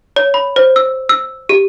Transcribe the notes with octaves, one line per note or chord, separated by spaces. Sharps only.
C#5
B5
C5
E6
E6
G4